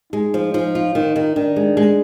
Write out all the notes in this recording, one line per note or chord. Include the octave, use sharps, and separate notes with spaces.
G#3 D#4
F3
F3 D#4
F4
D#3 D#4
D#3
D#3 D4
G#3
G#3